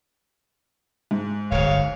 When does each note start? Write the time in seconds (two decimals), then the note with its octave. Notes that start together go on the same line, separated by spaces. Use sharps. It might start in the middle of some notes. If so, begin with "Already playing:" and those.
1.11 G#2
1.51 D1 G1 C#5 F5